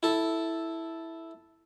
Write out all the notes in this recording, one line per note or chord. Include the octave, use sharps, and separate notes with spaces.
E4 A4